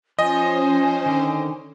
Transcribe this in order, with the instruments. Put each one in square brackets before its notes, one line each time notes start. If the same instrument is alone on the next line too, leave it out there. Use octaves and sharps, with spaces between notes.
[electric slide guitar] F3 [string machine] C#4 C5 [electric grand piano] D#5 [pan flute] G#5
[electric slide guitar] D3 D#3